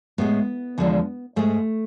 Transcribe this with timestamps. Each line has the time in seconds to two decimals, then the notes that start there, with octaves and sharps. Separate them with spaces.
0.18 A2 G#3 B3
0.78 E2 D3 F3 G#3
1.36 G#2 G#3 A3